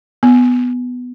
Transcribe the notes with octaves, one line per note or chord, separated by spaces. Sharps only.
B3